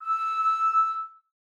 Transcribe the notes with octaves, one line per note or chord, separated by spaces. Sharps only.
E6